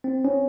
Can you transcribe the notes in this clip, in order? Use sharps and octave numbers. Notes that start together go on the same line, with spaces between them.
C4
C#4